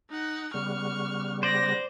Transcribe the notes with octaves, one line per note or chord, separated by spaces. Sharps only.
D#4 F#5
C#3 G3 B3 C#6 F6
C5 D5 A#6